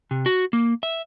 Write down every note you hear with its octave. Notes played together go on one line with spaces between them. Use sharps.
C3
F#4
A#3
E5